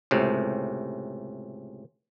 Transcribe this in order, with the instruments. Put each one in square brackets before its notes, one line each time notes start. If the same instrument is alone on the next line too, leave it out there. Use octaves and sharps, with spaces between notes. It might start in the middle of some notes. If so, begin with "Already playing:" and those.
[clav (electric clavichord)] C#2 A2 C3